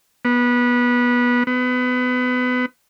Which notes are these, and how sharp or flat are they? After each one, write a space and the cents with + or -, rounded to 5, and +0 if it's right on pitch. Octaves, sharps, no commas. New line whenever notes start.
B3 -20
B3 +25